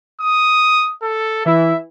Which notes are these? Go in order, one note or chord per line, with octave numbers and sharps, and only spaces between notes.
D#6
A4
E3 E4 E5